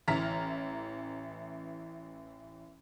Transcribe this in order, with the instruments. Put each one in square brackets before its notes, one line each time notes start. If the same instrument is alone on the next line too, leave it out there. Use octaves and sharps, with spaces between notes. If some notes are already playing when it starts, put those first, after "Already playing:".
[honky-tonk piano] A1 E3 E5 A#5 F6 B6